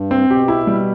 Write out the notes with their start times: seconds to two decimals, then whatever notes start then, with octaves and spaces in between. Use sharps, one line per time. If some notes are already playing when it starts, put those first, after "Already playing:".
Already playing: G2
0.11 C4
0.30 B2 G4
0.48 E4
0.67 G3